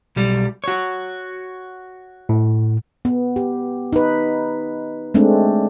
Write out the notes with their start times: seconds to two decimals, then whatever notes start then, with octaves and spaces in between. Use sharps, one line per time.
0.16 B1 G3
0.64 F#4 C#5
2.29 A2
3.05 B3
3.36 G4
3.93 D#4 B4
5.14 G#3 A3 C4 D4